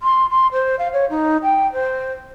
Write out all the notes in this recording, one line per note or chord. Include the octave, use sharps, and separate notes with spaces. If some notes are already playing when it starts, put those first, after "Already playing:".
C6
C6
C5
F5
C#5
D#4
G5
C5